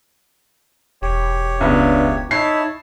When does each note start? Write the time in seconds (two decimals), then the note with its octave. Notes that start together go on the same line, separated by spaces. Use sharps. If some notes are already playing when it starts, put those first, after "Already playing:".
1.02 E1 G4 C#5
1.61 C#2 B3 D4 E5 F5
2.31 D#4 E4 C#5 A5 C7